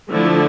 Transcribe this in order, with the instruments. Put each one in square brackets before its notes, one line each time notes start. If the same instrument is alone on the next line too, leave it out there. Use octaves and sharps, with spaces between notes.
[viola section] D3 F3 A3 E4